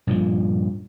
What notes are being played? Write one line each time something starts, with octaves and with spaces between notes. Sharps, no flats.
G2 A#2 F3